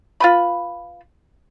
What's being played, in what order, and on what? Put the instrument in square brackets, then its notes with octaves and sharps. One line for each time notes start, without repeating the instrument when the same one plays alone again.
[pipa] F4 B4 B5